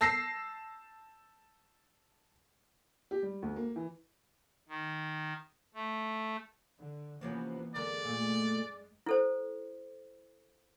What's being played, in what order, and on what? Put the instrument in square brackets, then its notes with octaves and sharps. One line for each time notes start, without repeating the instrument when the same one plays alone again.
[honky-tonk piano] A5 E6 A#6 C7
[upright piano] G4
G3
D2
A#3
E3
[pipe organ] D#3
A3
[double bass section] D3
[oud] C3 F3 C#4 [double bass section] E3 A#3 B3
[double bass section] F#2 G#3 [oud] D3 A#4 [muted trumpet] D5
[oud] A#2 A3
[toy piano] E4 A4 C5